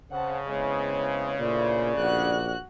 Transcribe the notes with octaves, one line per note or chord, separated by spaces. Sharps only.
C#3 C4 B4 F#5 A5
G#3 B3 C4 E4 C#5
A#2 A3 D4 E4 C5 D5
A#1 F#4 F#6